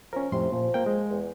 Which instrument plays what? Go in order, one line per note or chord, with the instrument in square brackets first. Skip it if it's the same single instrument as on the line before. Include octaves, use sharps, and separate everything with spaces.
[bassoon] F3 [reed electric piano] C#4 A#4
[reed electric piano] F2 A2 C6 [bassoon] C3
[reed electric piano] A#2 [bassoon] F3
[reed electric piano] A#3 G5
G#3
[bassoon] E2